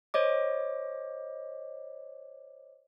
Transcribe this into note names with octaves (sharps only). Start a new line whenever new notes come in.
C5 C#5 D#5 D6